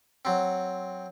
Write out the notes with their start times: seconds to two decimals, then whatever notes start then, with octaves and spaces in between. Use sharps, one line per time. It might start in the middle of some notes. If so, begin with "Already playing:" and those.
0.25 F#3 C4